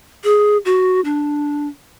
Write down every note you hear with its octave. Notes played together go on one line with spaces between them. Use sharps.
G#4
F#4
D4